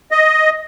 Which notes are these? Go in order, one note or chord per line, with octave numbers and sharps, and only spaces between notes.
D#5